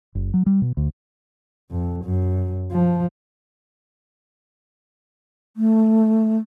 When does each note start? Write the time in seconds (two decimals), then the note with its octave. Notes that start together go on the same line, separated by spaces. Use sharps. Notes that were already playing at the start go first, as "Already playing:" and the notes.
0.15 F#1
0.34 F#3
0.46 G3
0.62 B2
0.77 D2
1.71 F2
2.05 F#2
2.71 F3
5.57 A3